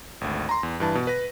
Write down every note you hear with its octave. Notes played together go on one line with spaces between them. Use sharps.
G#1 D2
A#5 C6
E2
G2 E3 A5
B2
B4 A#6